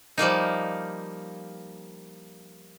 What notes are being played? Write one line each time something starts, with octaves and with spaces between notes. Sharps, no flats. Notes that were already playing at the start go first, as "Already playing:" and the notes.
F3 G3 A#3 D#4